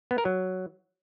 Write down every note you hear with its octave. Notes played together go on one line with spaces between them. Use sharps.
B3
A#4
F#3